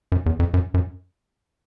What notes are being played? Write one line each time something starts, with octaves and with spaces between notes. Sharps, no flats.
F#2
E2
F2
F#2
F#2